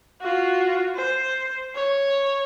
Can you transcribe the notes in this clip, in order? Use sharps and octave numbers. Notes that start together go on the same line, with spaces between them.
F4 F#4
C5
C#5